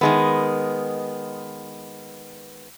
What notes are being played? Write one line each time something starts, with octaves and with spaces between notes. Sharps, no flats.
D#3 G#3 B3